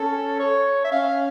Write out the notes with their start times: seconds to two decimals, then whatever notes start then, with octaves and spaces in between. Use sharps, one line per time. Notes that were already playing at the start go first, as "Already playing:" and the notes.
Already playing: C#4 A4
0.40 C#5
0.84 E5
0.91 C#4 F5